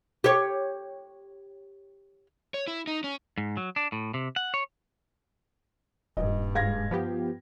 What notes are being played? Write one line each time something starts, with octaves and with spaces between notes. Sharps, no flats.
G4 C#5
C#5
E4
D#4
C#4
G#2
F#3
D4
A2
C3
F#5
C#5
D#1 G2 D#5
G#2 G#3 F5 G#6 A#6
F3 B3 G4